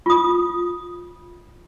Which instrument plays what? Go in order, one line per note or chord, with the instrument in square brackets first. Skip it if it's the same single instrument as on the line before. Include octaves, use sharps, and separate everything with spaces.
[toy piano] F4 D#6